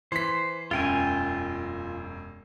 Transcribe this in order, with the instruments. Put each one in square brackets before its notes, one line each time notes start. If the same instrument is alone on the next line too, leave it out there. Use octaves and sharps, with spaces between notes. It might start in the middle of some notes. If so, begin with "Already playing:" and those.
[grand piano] E3 B6 [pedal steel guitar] C5
[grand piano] E1 F#2 [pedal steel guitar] F4 G5 G#5